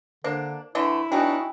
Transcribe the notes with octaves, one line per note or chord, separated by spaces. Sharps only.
D3 A#3 D4 C5
D3 E3 A3 E4
F#3 B3 D4 D#4 F#4 G5 G#5